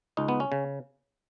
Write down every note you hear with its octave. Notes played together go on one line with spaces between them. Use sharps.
C#2 D#4
B3
C#4
C#3